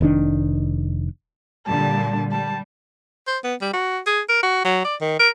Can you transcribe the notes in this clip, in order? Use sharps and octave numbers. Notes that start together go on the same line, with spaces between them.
F1 D#3 D4
A#2 D3 G3 A5
G3 A5
C5
B3
G3
F#4
G#4
A#4
F#4
F#3
D5
D#3
A#4